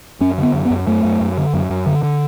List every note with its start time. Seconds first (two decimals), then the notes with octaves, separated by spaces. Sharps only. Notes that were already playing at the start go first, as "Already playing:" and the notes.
0.21 F#2 C#4
0.38 D3
0.43 B3
0.54 F#2
0.65 B3
0.70 F#2
0.87 F#2 A3
1.04 F#2
1.21 F#2
1.37 D3
1.54 F#2
1.70 F#2
1.86 D3
2.03 D3